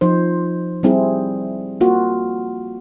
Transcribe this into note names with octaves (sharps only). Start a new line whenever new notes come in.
F3 D#4 C5
G3 C4 E4 G#4
A#3 F4 F#4